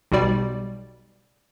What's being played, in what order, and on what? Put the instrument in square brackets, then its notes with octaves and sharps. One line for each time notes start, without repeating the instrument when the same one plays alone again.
[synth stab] B1 B2 G3 D5